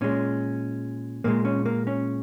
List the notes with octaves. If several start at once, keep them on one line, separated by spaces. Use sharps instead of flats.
A#2 G#3 C#4
A#2 G#3 A#3
C#4
A#3
C#4